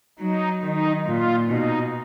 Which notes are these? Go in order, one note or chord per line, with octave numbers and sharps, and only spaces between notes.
F#3 D#4
D#3 D#4
A#2 F4
B2 D#4